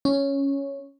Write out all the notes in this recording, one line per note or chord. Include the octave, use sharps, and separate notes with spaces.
C#4